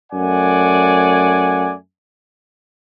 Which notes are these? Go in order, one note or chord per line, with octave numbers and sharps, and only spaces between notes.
F#2 A3 D5 F#5 G#5